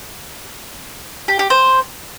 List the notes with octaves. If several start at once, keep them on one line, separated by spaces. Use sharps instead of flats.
G4
G4
C5